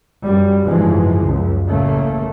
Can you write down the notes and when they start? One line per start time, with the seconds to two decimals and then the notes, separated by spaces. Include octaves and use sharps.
0.25 F#2 G3
0.63 F#1 G#2 E3 F3 G#3
1.23 C#2 F#2
1.67 A1 A2 C#3 A3 A#3